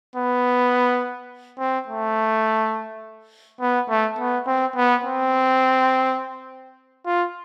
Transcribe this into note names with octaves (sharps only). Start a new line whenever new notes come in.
B3
C4
A3
B3
A3
B3
C4
B3
C4
F4